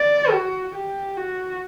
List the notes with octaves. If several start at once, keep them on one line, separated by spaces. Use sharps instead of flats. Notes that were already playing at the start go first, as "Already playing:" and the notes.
Already playing: D5
F#4
G4
F#4